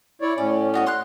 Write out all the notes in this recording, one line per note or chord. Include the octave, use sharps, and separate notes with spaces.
E4 C#5 D5
A2 C#4 D5
B3 F#4 D#5
C6 F6 F#6